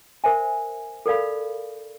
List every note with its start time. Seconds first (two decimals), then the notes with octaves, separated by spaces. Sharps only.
0.24 A#4 C5 E5 G#5
1.06 A4 A#4 D5 F5 B5